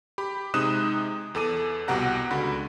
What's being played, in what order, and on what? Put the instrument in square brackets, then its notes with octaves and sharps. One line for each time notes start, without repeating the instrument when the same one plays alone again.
[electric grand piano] G4 B5
C3 G#3 D#4 D#6 F#6 E7
E2 A4 D6 D#7
C2 B2 G4 F#5 A#5 F#6
C#2 D3 F#4 B5